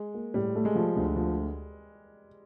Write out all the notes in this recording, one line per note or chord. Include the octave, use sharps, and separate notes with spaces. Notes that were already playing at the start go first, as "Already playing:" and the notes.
Already playing: G#3
A#3
A2 G3
A3
G#3
F3
D2
F3